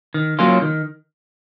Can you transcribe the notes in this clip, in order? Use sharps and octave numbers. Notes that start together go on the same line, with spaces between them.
D#3
F#3 A#3 C#4 F4
D#3